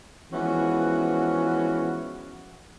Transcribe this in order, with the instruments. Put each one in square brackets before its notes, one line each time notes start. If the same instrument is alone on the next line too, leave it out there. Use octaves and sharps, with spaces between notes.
[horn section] E3 F3 G#3 B3 C#4 F#4